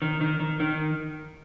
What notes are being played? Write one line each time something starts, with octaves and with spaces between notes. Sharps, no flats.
D#3
D#3
D#3
D#3